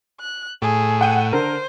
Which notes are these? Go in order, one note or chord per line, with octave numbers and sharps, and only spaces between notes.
F#6
A2 G#4
F#5 G5 D#7
D3 A#4 C5